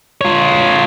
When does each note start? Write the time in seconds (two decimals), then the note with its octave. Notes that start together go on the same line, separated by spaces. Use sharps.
0.21 F4 C#5